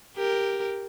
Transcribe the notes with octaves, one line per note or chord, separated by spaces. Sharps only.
G4 A#4